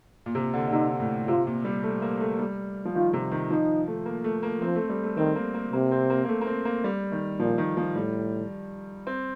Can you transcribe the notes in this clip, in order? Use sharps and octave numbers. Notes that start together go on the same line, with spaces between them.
A#2
C3
D3
D3
C3 D#4
A2
C3 F4
A#2
G3
A3
A#3
A3
G3
F3
D#3 F4
C3
D#3
F3 D#4
A3
A#3
A3
A#3
F3 C4
A3
G3
A3
D#3 C4
A#3
A#3
C3 A#3
C4
A#3
A#3
A3
A#3
C4
A#3
G3
D#3
A#2 F3
D#3
F3
A2 G3
C4